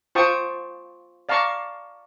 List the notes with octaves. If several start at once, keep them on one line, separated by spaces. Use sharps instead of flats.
F4 C5 G5 A5 C#6 D#6
D5 F5 A5 A#5 C#6 D6